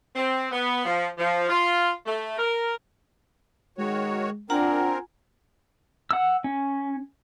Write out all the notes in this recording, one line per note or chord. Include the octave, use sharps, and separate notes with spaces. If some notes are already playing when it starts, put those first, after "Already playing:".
C4
B3
F3
F3
F4
A3
A#4
D#3 G#3 F#4 C#5
C4 D4 F4 A#4 F#5 G#5 A#5
F#5 E6
C#4